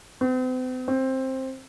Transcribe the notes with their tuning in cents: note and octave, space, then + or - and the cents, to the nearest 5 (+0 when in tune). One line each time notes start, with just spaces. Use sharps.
C4 -45
C4 +10